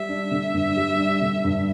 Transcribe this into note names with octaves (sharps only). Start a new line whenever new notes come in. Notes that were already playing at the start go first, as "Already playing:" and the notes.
Already playing: G3 E5
D4
D3
G2
G3
D4
D3
G2